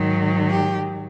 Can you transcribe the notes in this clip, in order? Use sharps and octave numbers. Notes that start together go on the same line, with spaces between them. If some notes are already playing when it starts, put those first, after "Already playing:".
Already playing: G#2 D#3 F#3
G4